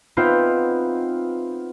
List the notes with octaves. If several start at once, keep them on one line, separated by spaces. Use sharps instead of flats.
B3 C4 D#4 F4 C5 E5